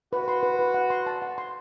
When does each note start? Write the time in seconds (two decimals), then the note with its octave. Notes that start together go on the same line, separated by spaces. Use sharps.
0.12 F#4 B4
0.28 C6
0.43 B4
0.59 B4
0.74 F#5
0.90 C6
1.07 A5
1.22 F#5
1.38 C6